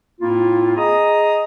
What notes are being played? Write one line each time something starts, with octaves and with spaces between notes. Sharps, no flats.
A2 A#3 C4 E4 F4
G#4 D#5 A#5 D#6